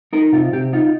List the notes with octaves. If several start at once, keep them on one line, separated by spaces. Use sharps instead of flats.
D#4 A#4
C3 F4
C3 G4
D#4 F4